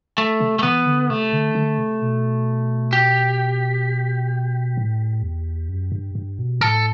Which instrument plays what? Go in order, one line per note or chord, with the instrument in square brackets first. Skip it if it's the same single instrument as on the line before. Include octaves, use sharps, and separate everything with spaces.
[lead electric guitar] A3
[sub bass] C3
[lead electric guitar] A3
[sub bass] E3 [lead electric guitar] B3
[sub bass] D3
[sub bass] C3 [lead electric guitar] A3
[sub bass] D3
D3
C3
B2
[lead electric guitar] G4
[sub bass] A2
E2
F#2
G2
G2
B2
[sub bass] A2 [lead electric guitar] A4